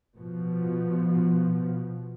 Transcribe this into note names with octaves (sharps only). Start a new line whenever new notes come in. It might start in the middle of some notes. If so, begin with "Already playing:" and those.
B2 F3